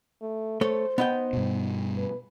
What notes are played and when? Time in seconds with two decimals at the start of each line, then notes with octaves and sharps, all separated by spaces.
0.21 A3
0.61 A3 A4 C5 C#5
0.98 B3 D#4 G5
1.33 G2 B2
1.97 B4